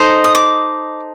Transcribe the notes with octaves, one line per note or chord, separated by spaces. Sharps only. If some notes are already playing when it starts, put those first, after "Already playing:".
Already playing: D#4 A4 C5 D#5
D#6
D6